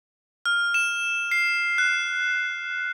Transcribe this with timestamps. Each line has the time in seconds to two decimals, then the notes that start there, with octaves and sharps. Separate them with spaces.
0.46 F6
0.74 E7
1.31 C7
1.78 F#6